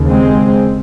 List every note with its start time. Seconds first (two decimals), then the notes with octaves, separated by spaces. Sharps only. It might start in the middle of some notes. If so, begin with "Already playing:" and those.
Already playing: D#2 C#3
0.08 G#3 C4